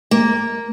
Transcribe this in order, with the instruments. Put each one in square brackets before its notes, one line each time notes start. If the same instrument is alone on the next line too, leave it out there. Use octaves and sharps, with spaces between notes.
[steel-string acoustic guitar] A#3